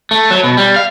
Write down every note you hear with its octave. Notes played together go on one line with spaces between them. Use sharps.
A3
F#3
B2
G3
F5